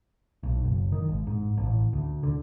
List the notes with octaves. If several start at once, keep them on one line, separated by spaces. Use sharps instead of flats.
B1
F#1
D#3
G#1
G#2
A1
D2
D3